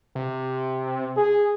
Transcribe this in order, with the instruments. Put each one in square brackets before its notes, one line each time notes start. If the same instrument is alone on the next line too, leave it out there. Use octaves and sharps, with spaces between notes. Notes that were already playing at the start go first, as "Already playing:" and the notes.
[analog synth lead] C3
[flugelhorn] G#4